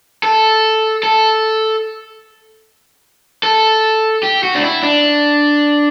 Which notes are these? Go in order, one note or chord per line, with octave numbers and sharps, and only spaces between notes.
A4
A4
A4
G4
F#4
D4
E4
D4